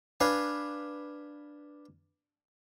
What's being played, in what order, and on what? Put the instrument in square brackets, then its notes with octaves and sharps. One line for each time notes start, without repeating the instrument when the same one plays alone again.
[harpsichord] D4 B4 F5 G#5